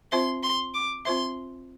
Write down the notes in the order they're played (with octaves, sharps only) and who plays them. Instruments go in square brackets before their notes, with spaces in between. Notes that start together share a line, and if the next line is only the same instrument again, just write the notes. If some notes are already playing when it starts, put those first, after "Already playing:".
[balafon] C4 F4 C5 E5 [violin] C6
[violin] C6
D6
[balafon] C4 F4 C5 E5 [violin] C6